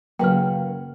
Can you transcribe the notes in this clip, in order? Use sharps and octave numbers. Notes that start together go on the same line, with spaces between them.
C#3 F#3 A#3 F#4 B4 G5 F6